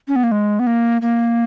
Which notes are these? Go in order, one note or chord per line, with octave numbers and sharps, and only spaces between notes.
C#4
B3
A#3
G#3
B3
A#3
A#3